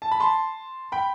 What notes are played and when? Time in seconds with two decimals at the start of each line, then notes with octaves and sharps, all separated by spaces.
0.02 A5
0.12 B5
0.20 A5 C6
0.92 G5 B5